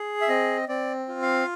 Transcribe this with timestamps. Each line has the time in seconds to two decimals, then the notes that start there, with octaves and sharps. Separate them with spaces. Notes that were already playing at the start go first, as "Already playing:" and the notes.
Already playing: G#4
0.21 E5
0.29 C4 D#5
0.69 C4 D5
1.08 F4
1.22 F5